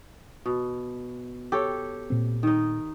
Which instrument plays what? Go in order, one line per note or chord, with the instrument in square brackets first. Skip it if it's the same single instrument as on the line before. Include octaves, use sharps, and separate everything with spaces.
[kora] B2
G4 A4 C#5
[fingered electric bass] A#2 C4
[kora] D#3 D#4